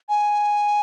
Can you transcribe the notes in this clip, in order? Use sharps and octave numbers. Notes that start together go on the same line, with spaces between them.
G#5